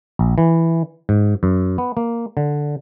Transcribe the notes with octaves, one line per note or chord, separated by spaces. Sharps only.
A#1
E3
G#2
F#2
B3
A#3
D3